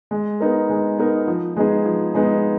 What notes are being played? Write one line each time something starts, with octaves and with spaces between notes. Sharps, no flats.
G#3
B3 D#4 A#4
G#3
B3 D#4 A#4
F3
G#3 B3 D#4 G#4
F3
G#3 B3 D#4 G#4